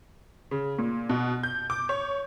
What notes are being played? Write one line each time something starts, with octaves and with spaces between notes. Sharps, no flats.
C#3
A#2
B2
G6
D6
C#5